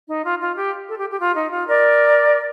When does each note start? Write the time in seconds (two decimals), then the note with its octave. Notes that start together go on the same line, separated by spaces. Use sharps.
0.09 D#4
0.25 F4
0.40 F4
0.57 G4
0.88 A4
0.99 G4
1.09 G4
1.20 F4
1.36 D#4
1.51 F4
1.67 A#4 D5